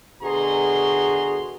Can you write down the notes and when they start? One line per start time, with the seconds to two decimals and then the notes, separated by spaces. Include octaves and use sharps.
0.23 B2 D3 F#4 G#4 A#5 C6